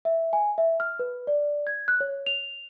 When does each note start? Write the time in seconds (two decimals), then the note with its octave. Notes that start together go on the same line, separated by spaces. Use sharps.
0.05 E5
0.33 G#5
0.58 E5
0.80 F6
0.99 B4
1.27 D5
1.67 G#6
1.88 F#6
2.01 C#5
2.26 F7